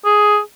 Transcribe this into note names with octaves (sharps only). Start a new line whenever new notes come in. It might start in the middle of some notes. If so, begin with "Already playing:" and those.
G#4